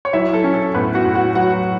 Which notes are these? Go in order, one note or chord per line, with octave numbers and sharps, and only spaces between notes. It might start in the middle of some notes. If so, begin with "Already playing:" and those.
C#5
F#3 E4 E5
A4
C#4
A4
A2 B3 B4
F#4 F#5
A2
F#4 F#5
F#3 F#4 F#5